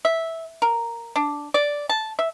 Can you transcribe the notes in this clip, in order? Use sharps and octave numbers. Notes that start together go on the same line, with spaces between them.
E5
A#4
D4
D5
A5
E5